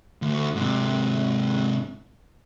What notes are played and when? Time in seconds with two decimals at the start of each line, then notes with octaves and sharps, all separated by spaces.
0.22 D2
0.55 G#2 C3